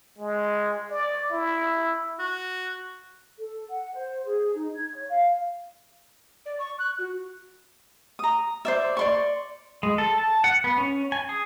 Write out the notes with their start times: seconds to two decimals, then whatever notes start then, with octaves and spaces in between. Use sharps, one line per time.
0.18 G#3
0.90 D5
1.31 E4
2.19 F#4
3.38 A4
3.70 F#5
3.94 C5
4.26 G#4
4.54 D#4
4.75 G#6
4.95 C#5
5.09 F5
6.46 D5
6.59 C#6
6.79 F#6
6.99 F#4
8.19 A#5 D#6
8.65 C5 D5 E5
8.97 D5 C6 C#6
9.83 G#3
9.98 A4
10.18 A5
10.44 F#5
10.64 B3
10.78 C#4
11.12 G#5
11.29 G#4